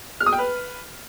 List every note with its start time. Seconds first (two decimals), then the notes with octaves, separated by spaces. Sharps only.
0.20 F6
0.26 D#6
0.32 G5
0.38 B4